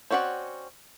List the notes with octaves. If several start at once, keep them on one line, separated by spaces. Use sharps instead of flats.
C4 C#4 F#4 D5 F#5